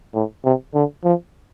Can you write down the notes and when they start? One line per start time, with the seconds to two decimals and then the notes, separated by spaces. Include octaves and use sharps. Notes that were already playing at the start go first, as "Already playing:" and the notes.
0.14 A2
0.44 C3
0.74 D3
1.04 F3